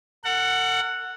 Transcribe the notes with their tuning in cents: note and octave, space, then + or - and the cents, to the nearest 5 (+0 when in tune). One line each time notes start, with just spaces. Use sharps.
A4 +45 F#5 +0